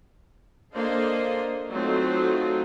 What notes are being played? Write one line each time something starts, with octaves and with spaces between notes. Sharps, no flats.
A#3 D4 A4 C5 D#5 F5
F#3 A3 C4 D#4 F4